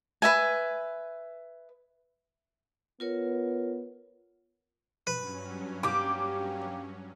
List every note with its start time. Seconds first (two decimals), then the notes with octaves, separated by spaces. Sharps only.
0.22 B4 E5 G#5
3.00 B3 F4 A#4 C#5
5.07 G2 F#3 C#4 B4
5.83 A#3 G4 D6